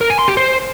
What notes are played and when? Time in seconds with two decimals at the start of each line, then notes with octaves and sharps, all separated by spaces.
0.01 A#4
0.10 G#5
0.19 C6
0.28 G4
0.37 C5